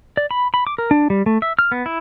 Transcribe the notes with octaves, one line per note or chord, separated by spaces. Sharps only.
D5
B5
B5
D6
A#4
D4
G3
A3
E5
F6
B3
E4